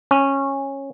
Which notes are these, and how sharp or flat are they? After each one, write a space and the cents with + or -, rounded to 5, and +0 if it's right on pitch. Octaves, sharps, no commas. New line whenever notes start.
C#4 -15